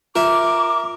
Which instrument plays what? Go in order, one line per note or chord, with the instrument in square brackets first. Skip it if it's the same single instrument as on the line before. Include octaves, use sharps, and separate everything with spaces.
[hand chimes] F4 [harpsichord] A#4 E5 [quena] D6